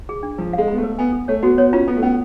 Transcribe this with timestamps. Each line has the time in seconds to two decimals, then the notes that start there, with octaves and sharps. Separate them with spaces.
0.09 G#4
0.23 D4
0.38 F3 B4
0.53 G#3 F5
0.68 B3 B5
0.78 A3
0.83 B4
0.98 B3 G#5
1.13 A4
1.28 A3 C#5
1.42 B3 F#4
1.57 B3 C#5
1.73 C#4 F4
1.88 B3 A4
1.97 A3
2.03 B3 C#4